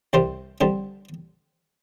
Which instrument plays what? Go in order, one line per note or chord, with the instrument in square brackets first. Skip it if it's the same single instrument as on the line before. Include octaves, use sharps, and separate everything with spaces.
[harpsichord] C2 C3 G3 C4 C5
F2 D3 G3 C4